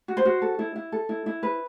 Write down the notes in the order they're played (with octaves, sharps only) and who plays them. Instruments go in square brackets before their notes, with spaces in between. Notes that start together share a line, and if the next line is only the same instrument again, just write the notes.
[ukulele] F#4
C5
F#4
A4
E4
E4
A4
E4
E4
B4